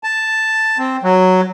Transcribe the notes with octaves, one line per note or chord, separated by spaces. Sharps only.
A5
C4
F#3